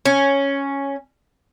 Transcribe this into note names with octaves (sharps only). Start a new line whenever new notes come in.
C#4